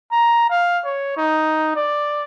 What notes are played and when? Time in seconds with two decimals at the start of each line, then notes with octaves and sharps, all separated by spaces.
0.12 A#5
0.50 F5
0.85 C#5
1.17 D#4
1.76 D5